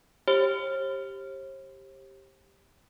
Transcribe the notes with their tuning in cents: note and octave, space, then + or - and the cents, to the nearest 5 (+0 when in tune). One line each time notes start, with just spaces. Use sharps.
G4 +0 C5 +45